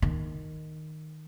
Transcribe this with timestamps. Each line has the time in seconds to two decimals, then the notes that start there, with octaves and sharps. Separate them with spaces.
0.02 D#3